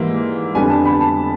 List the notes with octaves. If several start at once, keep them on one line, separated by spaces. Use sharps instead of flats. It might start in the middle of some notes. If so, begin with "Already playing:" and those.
Already playing: G#2 E3 G3 A#3
F2 D3 G3 B3 G#5
A5
B5
A5